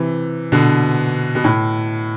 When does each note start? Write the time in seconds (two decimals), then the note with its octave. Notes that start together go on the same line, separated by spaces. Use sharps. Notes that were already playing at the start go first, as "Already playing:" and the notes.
Already playing: C3 E3
0.52 B2 D3
1.35 B2
1.44 A2